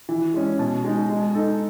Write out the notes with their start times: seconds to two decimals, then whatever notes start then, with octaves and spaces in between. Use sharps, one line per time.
0.09 E3
0.34 G#3 C#4
0.59 B2
0.84 G#3 D#4
1.09 G#3
1.34 D#4 A4